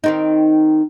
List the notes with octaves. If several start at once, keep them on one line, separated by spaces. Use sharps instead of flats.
D#3 C4 D#4